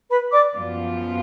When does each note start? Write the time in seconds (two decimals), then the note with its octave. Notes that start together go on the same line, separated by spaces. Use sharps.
0.09 B4 B5
0.32 D5 D6
0.55 F#2 F3 B3 F4